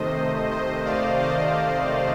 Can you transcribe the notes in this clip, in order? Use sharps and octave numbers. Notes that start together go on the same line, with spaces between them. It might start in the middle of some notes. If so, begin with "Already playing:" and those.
Already playing: C3 D#3 A3 C5 D#5
C5 D#5
D5 F5
C5 D#5